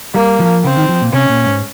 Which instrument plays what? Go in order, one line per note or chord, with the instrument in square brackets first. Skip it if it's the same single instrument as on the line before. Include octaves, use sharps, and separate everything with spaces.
[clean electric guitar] G3 [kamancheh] A#3
[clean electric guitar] F3
[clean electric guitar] C#3 [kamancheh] C4
[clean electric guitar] D#3
F3
A#2
[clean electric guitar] C3 [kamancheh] C#4
[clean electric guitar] A#2
G#2